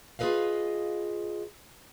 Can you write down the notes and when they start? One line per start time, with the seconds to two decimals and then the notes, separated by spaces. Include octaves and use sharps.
0.19 F4 G#4 A4 B4 D#5 F5